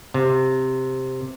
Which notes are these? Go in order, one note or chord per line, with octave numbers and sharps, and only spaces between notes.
C3